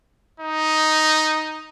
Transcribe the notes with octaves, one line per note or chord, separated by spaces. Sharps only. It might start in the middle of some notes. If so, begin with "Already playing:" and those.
D#4